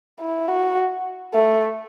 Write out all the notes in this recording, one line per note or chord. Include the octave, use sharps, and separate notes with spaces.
E4
F#4
A3